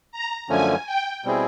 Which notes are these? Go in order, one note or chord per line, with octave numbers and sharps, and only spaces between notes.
A#5
F#2 D3 F3 A3 C#4 G#5
G5
B2 G3 C4 E4 G#4